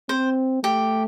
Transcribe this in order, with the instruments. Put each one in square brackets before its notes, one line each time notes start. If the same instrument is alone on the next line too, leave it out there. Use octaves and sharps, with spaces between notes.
[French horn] C4 [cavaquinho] C5
[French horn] A3 [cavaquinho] G4